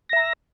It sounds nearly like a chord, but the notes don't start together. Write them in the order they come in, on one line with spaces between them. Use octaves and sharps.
A#6 E5 A#5